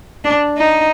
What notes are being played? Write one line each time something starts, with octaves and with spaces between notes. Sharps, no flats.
D4
D#4